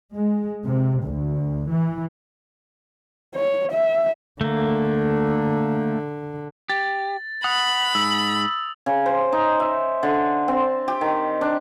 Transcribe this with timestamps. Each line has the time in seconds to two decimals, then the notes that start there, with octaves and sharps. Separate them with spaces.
0.13 G#3
0.65 C3
1.03 D2
1.70 E3
3.35 C#5
3.72 E5
4.41 D3 A3 A#3
6.70 G4 A6
7.44 F#5 B5 D#6
7.95 G#2 E6
8.86 C#3
9.06 C5
9.32 D#4
9.60 E5
10.03 D3
10.48 C4
10.88 G4
11.01 D#3
11.41 D4